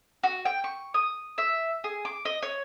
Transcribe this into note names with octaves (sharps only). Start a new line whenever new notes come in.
F#4
G5
C#6
D#6
E5
G#4
D6
D#5
C#5